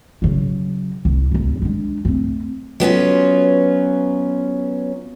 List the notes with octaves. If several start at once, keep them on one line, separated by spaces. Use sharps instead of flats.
C#3 F#3
C2
G#1 D2
G#3 D4
A3 C4
F#3 B3 C#4 F4